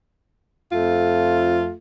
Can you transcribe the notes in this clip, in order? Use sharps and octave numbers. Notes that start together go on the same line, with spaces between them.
F2 A3 F4